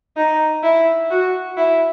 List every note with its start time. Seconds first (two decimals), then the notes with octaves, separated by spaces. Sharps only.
0.16 D#4
0.63 E4
1.10 F#4
1.57 E4